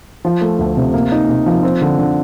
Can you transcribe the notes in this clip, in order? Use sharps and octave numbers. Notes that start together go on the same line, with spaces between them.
F3
A3
D2
C3
A#3
D#4
C3
F3
C4
D3
D3